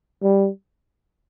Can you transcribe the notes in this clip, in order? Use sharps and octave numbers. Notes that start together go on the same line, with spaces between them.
G3